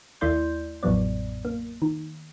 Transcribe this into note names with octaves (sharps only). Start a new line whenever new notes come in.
D#2 A3 E4 D5 C6 G6
A1 F2 A2 F#3 B3 D5
A#3
D#3